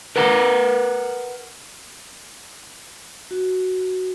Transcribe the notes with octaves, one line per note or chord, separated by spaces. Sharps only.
A#4 B4 F#5 A#5
F#4